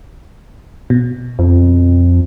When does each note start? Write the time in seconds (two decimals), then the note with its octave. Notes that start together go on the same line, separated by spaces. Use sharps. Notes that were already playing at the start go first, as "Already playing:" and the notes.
0.90 B2
1.39 F2